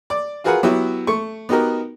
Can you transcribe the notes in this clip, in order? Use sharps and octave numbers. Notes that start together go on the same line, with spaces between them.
D5 D6
F4 F#4 G#4 A#4 B4 F#5
F#3 B3 E4 F#4 G4
A3 C#6
B3 D#4 F#4 G4 A#4